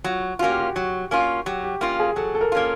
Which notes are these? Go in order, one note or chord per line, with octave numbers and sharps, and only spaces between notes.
F#3 F4
A#3 C#4 F4 F#4
G4
F#4
F#3
A#3 C#4 F4
F#3 G4
G4
A#3 C#4 F4
G#4
F#3 A4
A4
A#4
A#3 C#4 F4